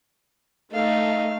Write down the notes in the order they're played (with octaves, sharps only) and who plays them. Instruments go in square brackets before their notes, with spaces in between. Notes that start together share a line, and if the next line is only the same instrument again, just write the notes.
[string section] A3 [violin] D#4 [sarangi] F5